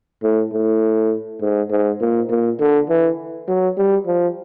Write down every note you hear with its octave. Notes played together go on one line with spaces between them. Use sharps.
A2
A2
G#2
G#2
A#2
A#2
D3
E3
F#3
G3
F3